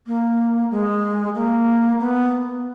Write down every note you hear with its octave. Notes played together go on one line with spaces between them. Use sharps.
A#3
G#3
A#3
B3